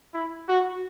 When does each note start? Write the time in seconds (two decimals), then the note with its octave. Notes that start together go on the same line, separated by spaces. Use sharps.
0.14 E4
0.48 F#4